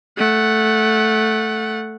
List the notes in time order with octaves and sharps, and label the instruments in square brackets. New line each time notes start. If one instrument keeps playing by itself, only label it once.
[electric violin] A3 F#5